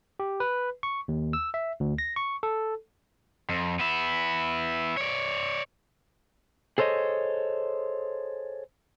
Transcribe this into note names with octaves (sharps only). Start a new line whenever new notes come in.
G4
B4
C#6
D#2
E6
E5
D2
A#6
C#6
A4
F2
B3 E4
C#5 D5
G#4 A4 C5 C#5 D#5